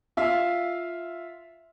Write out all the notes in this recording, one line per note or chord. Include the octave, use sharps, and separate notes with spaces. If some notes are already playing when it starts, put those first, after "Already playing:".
F4 E5 F5